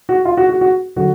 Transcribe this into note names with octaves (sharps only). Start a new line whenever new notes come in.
F#4
F4
F#4
F#4
F#4
D3 F#3 F#4